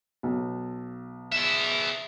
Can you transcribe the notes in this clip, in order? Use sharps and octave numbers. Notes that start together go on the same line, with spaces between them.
B1
G#4 E5